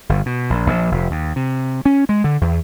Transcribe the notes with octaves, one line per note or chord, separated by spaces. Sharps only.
G1
B2
A#1
A#1
F1
D#2
C3
C#4
G#3
D3
E2